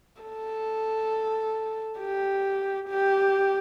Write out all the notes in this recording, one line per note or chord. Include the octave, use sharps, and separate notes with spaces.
A4
G4
G4